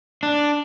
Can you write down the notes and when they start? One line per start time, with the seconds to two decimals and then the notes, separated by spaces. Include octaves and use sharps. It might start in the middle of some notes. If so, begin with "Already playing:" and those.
0.23 D4